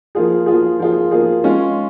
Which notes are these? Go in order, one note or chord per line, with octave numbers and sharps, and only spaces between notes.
F3 A#3 F4 G#4
F3 A#3 F4 G#4
F3 A#3 F4 G#4
F3 A#3 F4 G#4
G#3 C#4 F4